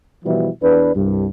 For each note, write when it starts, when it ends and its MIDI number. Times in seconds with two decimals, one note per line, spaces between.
0.25 0.49 47
0.25 0.49 52
0.25 0.49 53
0.25 0.49 55
0.25 0.49 64
0.62 0.94 40
0.62 0.94 62
0.62 0.94 71
0.95 1.27 36
0.95 1.27 43